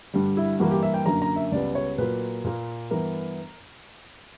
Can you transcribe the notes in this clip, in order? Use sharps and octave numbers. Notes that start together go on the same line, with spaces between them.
G2 D3 G3
E4
G2 E3 A#3 F#4
G4
E5
G5
F#2 D3 A#3 A#5
A#5
E5
C#2 C#3 G3 B3 D5
C#5
A#2 F#3 A#3 B4
A#2 A#3
G2 E3 B3 A#4